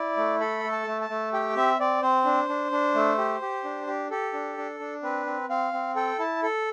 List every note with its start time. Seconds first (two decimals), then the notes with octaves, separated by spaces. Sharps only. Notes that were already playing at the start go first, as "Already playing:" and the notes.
Already playing: E4 D5
0.17 A3
0.40 A4 B5
0.64 A3
0.72 A5
0.87 A3
1.01 A5
1.09 A3
1.33 G4 G5
1.56 C4 E5
1.80 C4 D5
2.02 C4 C5
2.25 D4
2.49 D4
2.72 D4
2.95 A3
3.18 G4
3.42 G4
3.64 D4
3.87 G4
4.11 G4 A4
4.33 D4
4.58 D4
4.80 D4
5.03 C4 B4
5.26 C4
5.49 C4 F5
5.73 C4
5.96 A4 G5
6.19 E4 A5
6.43 A4